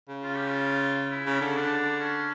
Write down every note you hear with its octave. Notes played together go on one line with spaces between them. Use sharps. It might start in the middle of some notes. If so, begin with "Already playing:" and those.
C#3
F4
G4
F4
E4
C#3
D3
C#4
D4
C#4